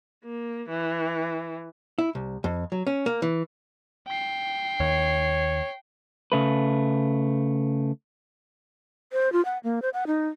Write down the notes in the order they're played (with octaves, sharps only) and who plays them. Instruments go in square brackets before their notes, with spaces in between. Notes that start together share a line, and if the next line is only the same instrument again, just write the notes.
[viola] A#3
E3
[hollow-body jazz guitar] E4
C2
F2
F#3
C#4
A#3
E3
[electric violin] G5 C7
[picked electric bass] D#2 [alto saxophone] C#5
[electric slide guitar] C#3 A3 B4
[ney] C5
F4
F#5
A#3
C5
F#5
D#4